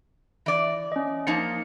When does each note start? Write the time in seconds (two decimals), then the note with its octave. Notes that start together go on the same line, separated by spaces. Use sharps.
0.46 E3 D5
0.92 C#4 D#5
1.27 F3 A#3 D#4 C#7